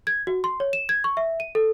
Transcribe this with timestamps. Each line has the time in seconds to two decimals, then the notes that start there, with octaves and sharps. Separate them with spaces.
0.07 G#6
0.27 F#4
0.44 C6
0.60 C#5
0.73 E7
0.89 G#6
1.04 C#6
1.17 E5
1.40 D#7
1.55 A4